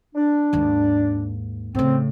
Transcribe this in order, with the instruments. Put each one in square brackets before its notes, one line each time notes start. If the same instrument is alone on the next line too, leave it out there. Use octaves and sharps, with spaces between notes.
[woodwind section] D4
[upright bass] D#2 G#2
[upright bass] A2 C#3 [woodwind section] C4